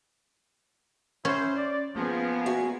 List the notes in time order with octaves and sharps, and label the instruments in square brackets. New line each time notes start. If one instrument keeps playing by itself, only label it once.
[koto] C#4 [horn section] E4 C5
[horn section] D5
[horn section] F3 [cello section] A#3 B3 G#4
[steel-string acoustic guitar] F#4 E5 G#5